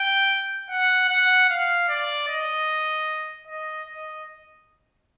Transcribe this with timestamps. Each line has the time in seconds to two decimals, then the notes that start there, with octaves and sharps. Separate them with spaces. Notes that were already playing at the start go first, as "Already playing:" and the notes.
Already playing: G5
0.70 F#5
1.10 F#5
1.50 F5
1.89 D5
2.28 D#5
3.47 D#5
3.88 D#5